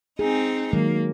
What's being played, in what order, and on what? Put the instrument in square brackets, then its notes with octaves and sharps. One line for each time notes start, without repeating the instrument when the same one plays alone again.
[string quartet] C4 D#4 [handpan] G#4
[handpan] D#3 F#3 G#3 [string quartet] A#3